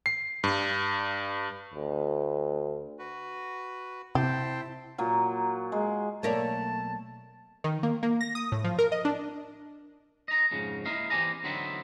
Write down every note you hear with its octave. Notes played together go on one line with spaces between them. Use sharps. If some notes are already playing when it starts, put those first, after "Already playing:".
C7
G2
D2
F#4 B4
C3 E4 G4 C5 G5 A5
A#2 F#3
G#3
B1 A3 A#3 A#4 C#5 D5 A5
D#3
A#3
A#3
A#6
D#6
A2
F3
A#4
D#5
D4
D#5 A#5
F2 G#2 C#3
A#3 E4 A#4 D#5 F5
E3 C4 G4 D5 G#5 A#5
D3 F#3 B3 C4 D#4 E4